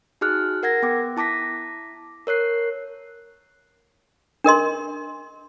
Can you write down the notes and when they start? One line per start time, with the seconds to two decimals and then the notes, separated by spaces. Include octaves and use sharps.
0.21 D#4 F#4 G#4 F6 F#6
0.63 A#4 F#5 G#6 A#6
0.83 B3 G5 D6
1.17 E4 A5 D6 A#6 B6
2.27 A#4 C#5 F#6 C7
4.44 D4 A#4 D#5 C6